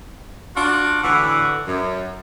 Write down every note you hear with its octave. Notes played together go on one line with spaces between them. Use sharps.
D4 F4 F#4
A2 D3 E3 F#4
F#2